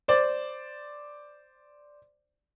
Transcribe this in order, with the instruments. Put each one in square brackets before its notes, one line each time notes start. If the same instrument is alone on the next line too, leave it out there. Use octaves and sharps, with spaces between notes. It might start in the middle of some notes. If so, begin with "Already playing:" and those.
[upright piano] C5 D5